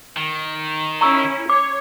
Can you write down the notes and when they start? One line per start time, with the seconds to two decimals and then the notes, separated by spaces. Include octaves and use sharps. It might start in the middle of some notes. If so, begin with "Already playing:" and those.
0.17 D#3
1.01 C#4 E4 A#5 C#6 E6
1.49 C#5 D6